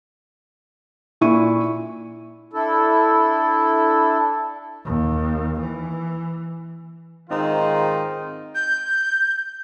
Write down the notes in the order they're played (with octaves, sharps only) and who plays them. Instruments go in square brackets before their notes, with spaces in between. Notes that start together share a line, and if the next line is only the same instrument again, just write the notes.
[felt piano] A#2 E4 C#6 D#7
[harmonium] D4 E4 A4
[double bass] D#2
E3
[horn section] G#2 D#3 C4 D#4 F4
[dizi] G6